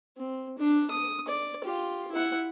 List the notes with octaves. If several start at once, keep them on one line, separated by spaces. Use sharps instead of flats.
C4
D4
D#6
D5
F4 G4
E4 F#5